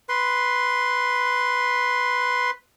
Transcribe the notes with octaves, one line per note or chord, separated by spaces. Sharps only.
B4 C6